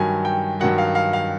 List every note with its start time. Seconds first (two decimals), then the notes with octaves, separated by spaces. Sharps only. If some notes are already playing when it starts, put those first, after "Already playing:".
Already playing: G2 D#3 F#3 G#5
0.25 G5
0.60 G2 D#3 F#3 F#5
0.78 F5
0.95 F5
1.13 F5